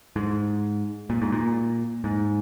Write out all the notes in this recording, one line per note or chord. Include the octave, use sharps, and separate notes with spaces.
G#2
A#2
G#2
A#2
G#2